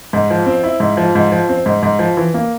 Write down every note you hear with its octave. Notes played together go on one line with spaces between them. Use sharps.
G#2
F3
C4
E4
G#2
F3
G#2
F3
C4
G#2
G#2
F3
E3
A#3